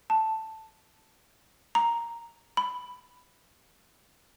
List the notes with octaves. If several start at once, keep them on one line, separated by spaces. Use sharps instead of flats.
A5
A#5
B5